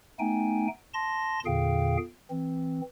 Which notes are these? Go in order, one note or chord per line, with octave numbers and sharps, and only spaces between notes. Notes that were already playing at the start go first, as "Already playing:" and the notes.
A3 B3 D#4 G5 G#5
A5 C6 A#6
E2 A#2 D3 G#4 F5 G5
E3 C4